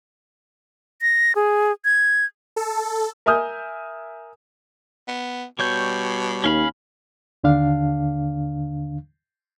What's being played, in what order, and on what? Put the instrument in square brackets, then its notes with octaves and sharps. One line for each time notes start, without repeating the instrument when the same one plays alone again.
[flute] A#6
G#4
G#6
[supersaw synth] A4
[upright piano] A#4 E5 G#5 D#6 F6 G6
[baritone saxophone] B3
[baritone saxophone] B2 [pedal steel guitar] G3 C#5 G6
[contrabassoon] D#2 [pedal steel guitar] C#4 F5 B5
[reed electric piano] D#2 D3 D4 F5